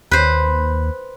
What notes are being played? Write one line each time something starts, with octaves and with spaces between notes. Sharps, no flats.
D#2 B4 C5